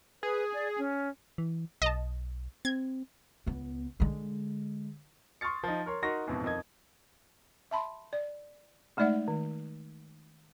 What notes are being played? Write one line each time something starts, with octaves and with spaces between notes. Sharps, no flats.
G#4 B4
D5
C#4
E3
B1 D#5 A5
C4 G#6
C#2 B3
D3 G#3
C6 C#6 D#6 F6 A6 C#7
F3 D#4
A#4 C#5 C6
D#4 F#4 A#4 C6 C#6 A#6
A1 F2 G#2 B2
F2 D#3 D#5 G#6
E5 A5 B5 C6
D5
G#3 A3 D#4 D5 E5 F#5
D#3